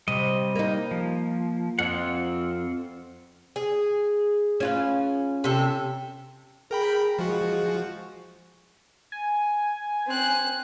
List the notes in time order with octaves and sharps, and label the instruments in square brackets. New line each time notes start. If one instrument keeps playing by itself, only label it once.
[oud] C3 [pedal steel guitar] G3 D#5
[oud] A#3 D#4
[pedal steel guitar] F3
[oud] F2 [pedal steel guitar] C4 F4 F#5
[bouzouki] G#4
[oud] C#4 F4 B4
[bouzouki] C3 A4
[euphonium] G#4 [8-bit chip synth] A#4 G5 B5
[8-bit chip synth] F3 F#4 [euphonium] G#3
[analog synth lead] G#5
[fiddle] C4 F#6